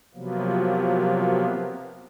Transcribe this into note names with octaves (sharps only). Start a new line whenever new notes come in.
C3 F3 F#3 A#3 B3